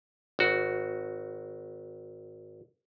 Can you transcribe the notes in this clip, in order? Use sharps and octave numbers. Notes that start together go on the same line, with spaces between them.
G#1 F#4